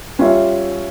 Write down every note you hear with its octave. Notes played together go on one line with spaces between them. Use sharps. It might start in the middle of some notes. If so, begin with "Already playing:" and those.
G3 C#4 F4 C#5 E5